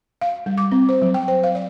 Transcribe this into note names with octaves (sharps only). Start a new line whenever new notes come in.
F5
G3
D6
C4
C5
F#3
G5
C5
F5
D5